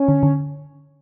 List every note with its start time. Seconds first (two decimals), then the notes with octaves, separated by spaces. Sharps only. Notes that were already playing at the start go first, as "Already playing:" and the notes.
Already playing: C#4
0.08 D3
0.23 D3